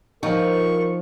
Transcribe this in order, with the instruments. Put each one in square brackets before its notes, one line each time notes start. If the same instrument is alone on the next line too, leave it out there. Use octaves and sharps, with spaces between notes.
[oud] F3 [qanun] D#4 [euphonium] A#4 [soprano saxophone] C#6